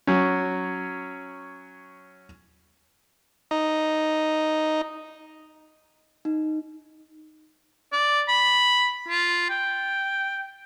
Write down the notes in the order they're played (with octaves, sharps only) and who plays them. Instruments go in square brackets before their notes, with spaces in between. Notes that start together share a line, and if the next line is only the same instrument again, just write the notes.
[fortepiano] F#3 C#4
[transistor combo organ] D#4
[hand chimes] D#4
[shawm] D5
B5
F4
G5